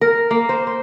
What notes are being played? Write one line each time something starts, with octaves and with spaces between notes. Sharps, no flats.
A#4
A#3
C5
C5